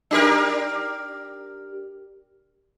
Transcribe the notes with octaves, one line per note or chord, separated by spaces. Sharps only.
D4 G4 A#4